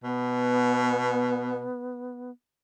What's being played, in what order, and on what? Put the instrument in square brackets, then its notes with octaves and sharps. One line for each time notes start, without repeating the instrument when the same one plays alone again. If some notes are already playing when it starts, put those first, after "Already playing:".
[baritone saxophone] B2 [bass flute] B3